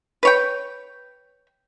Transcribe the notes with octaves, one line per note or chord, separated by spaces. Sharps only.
B4 C#5 G5